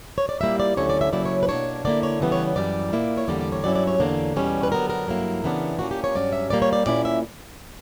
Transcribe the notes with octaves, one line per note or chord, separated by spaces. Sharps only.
C#5
D5
A#2 G3 A#3 E4 E5
D5
D2 D3 F#3 C#4 E4 C#5
D5
E5
C#3 F#3 A#3 E4 D5
C#5
B4
B2 A#3 D4 C#5
D3 A#3 E4 D5
C#5
C#3 E3 G3 B3
C#5
F#2 E3 G3 D5
A#2 A#3 E4
C#5
E2 D3 G3 A#3 D5
D5
C#5
G2 F#3 C#4 E4 D5
D5
C#5
E2 D3 A#3 D4
E2 B2 G3 C#4
B4
D3 F#3 B3 A#4
A#4
G2 F#3 A#3 E4
C#3 E3 B3 D4
A#2 A#3 C#4 F#4
G4
C#5
G2 F#3 C#4 D5
E5
A#2 G3 A#3 D5
C#5
D5
A#2 A#3 C#4 E4 D5
E5